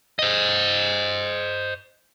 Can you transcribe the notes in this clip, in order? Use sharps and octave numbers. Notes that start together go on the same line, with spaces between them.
C5 D#5